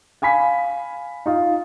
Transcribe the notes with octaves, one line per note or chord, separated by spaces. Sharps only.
F5 G#5 B5 B6
D#4 F4